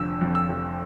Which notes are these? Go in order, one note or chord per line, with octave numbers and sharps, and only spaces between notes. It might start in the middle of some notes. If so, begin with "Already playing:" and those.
Already playing: F1 D3 F3 E6
F2
E6
F1